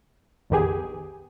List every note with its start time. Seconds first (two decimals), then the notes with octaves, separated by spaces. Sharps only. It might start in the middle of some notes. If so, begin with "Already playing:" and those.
0.50 A#1 F2 D#3 B3 G4 G#4